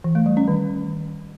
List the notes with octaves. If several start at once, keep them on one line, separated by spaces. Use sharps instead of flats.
E3
A3
G3
C#4
D#3